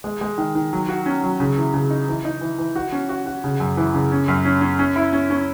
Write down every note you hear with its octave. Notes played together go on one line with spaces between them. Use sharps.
G#3
G#3
D#3
D#3
F#3
F#4
C#4
F#3
C#3
E3
C#3
D#4
E3
D#4
E3
E3
F#4
C#4
F#4
F#4
C#3
F#2
E3
C#3
C#4
F#2
C#4
C#4
C#4
E4
C#4
C#4